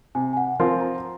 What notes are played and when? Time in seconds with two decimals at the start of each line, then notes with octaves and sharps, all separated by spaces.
0.15 C3 G#5
0.33 G#5
0.37 F#5
0.60 F3 C4 F4 A#4 C6
0.81 A#5